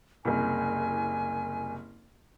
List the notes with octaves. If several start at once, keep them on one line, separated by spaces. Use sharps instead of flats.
F#1 C2 G#5